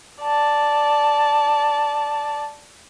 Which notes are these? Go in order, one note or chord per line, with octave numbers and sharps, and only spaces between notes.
D5 A5